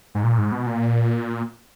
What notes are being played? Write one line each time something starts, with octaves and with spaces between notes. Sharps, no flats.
G#2
A#2
G#2
B2
A#2